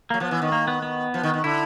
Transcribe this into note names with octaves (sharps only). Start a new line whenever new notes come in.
F#3 A#3
F3 B3
E3
D#3
A#3
B3
B3
F3
D#3
D#3
D3 E4